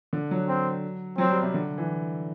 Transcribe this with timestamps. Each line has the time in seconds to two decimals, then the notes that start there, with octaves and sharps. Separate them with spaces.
0.13 D3
0.31 F#3
0.48 C4
1.18 F#3 C4
1.30 G3
1.42 C3
1.54 D3
1.78 E3